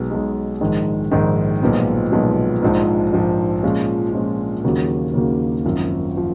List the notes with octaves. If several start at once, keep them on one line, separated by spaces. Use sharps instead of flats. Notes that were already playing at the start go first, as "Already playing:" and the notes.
Already playing: B1 B2 G#3
B1 B2 G#3
A#1 G#2 D#3 G#3
A#1 G#2 D#3 G#3
B1 A#2 F3 G#3 B3
B1 A#2 F3 G#3 B3
A#1 G#2 F3
A#1 G#2 F3
A#2 F3 G#3 C#4 F4
A#2 F3 G#3 C#4 F4
D#2 C#3 F#3 A#3
D#2 C#3 F#3 A#3
G#1 F#2 F3
F3